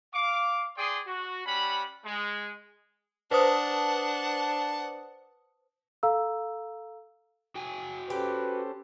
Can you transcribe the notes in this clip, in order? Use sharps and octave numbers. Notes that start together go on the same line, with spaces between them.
F5 D6
G#4 D5 G5 C6 D#6
F#4
G3 C#4 F#5 B5
G#3
D4 B4 C5 F#5 A5 D#6
A4 F5 A#5 E6
F#4 G5 G#5
C#4 G4 A4 B4 C5